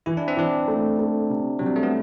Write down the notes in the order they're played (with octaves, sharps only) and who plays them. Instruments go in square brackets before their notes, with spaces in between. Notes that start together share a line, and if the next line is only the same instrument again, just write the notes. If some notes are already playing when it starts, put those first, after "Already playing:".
[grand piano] E3 [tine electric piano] E4
[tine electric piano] D4
C4
[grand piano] E3 [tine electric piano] D4
[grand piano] A3
A3
C3
[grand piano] C3 [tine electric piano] F#3
[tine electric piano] G3
A3
B3